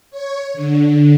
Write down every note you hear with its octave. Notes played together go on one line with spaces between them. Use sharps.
C#5
D3